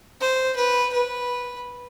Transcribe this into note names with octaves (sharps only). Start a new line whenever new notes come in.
C5
B4
B4